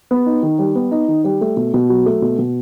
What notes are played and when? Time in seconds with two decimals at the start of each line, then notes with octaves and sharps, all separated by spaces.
0.11 B3
0.26 D#4
0.43 D#3
0.59 G3
0.75 B3
0.91 D#4
1.08 D#3
1.24 G3
1.41 A3
1.57 B2
1.74 B2
1.90 F#3
2.06 A3
2.22 B2
2.39 B2